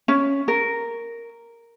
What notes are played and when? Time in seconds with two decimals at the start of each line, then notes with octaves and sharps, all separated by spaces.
0.08 C#4
0.48 A#4